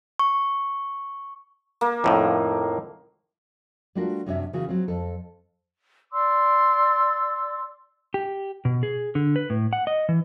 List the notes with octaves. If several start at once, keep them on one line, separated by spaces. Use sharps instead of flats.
C#6
A#3
F2 A2 D#3
G3 A3 D4 F4 F#4 A#4
F#2 C3 F#3 C#4 D4 E5
C#3 E3 A#3 F#4
F#3 C4
F2 A4
D5 C6 D6 E6
G4
B2
G#4
D3
B4
A2
F#5
D#5
E3